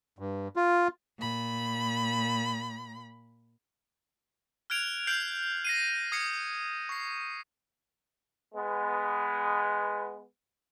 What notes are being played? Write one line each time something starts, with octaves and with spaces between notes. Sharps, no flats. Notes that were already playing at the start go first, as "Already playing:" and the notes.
G2
F4
A#2 B5
F6 F#6 G#6 D7 F7
F6 G6 C7 D7 F#7
A#6 C7 D#7
D#6 G#6 C7 C#7
C#6 C7
G#3 B3